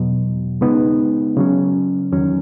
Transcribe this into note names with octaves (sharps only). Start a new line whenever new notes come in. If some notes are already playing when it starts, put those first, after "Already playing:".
Already playing: E2 B2 F#3
C#3 G#3 B3 D#4
C#3 F#3 C#4
E2 D#3 F#3 C#4